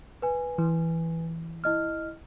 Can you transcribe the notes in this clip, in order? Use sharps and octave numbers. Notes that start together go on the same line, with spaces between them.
B4 G#5
E3
E4 D#5 F6